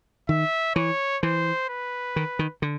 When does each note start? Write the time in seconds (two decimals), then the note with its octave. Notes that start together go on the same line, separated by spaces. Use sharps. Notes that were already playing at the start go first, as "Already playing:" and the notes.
0.29 D#3 E5
0.75 E3 C#5
1.23 E3 C5
1.69 B4
2.16 D#3
2.39 D#3
2.62 D3